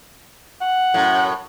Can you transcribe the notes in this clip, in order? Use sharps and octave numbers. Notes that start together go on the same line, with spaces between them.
F#5
F#2 A2